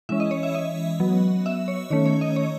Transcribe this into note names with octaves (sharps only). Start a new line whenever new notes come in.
E3 G#3 C#4 E5
D#5
C#5
E5
D#5
F#3 B3
E5
C#5
D#3 A3 C#4 C#5
C#5
D#5
C#5